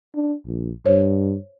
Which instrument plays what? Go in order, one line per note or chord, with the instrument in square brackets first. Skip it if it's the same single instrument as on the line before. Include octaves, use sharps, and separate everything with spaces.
[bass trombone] D4
A#1
[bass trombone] G2 [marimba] C5 C#5